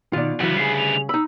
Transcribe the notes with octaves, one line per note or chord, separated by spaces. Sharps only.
B2 D#3 F4 D5
D2 C#3 E3 F#3 B3 F#5
G3 G#4 C7
F7
D#4 B5 E6